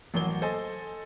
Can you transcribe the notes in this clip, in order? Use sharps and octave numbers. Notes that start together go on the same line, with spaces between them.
A1 F#3 A#3 G7
A4 C5 D#5 G#5